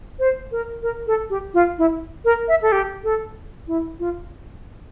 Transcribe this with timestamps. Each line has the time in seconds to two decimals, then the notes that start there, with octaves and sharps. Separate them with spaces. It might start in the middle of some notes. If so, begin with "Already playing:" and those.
0.19 C5
0.52 A#4
0.83 A#4
1.07 A4
1.30 G4
1.54 F4
1.78 E4
2.25 A#4
2.48 E5
2.62 A4
2.72 G4
3.04 A4
3.68 E4
4.00 F4